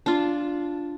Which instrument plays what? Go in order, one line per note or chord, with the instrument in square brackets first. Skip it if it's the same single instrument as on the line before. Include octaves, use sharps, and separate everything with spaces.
[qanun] D4 F4